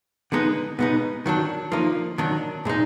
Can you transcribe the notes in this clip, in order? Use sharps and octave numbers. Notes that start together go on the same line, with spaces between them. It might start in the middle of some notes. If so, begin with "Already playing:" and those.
D3 G#3 B3 D#4
B2 G#3 B3 D#4
D#3 F#3 D4
D3 F3 A#3 D#4
D#3 F#3 D4
A#2 G#3 D#4